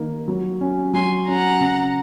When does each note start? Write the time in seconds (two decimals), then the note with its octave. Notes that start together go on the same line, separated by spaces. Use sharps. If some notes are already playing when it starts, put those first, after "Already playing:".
Already playing: D#3 A#3
0.28 F#3
0.61 C#4
0.93 F#3 G#5 C6
1.27 C#4 F#5 A#5
1.60 C#3